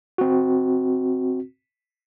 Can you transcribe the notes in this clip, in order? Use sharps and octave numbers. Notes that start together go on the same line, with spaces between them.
C4 F#4